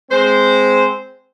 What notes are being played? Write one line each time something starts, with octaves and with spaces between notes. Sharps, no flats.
G#3 C4 C5